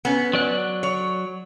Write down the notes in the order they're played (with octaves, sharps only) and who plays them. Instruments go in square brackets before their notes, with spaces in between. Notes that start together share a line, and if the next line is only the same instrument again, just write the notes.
[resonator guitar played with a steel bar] B3 C#4
[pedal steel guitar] F#3 D5 F#6
[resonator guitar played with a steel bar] C#5